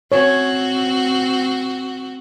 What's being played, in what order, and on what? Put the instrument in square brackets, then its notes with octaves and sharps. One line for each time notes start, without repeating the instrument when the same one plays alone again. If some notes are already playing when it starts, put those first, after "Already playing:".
[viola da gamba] C4 F#4 [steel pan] C#5